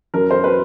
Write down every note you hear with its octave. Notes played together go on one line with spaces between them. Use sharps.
F#2 A#4
C5
B4